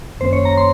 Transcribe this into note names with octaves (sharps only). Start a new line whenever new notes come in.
F#2 D#3 A#3 C#4 C5
C#5
A#5
C6